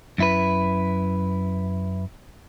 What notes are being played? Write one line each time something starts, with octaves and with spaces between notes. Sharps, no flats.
F#2 E4 B4